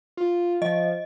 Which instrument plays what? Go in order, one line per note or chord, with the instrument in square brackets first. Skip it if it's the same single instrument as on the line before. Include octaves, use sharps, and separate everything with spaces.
[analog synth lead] F4
[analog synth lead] F3 [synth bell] D#5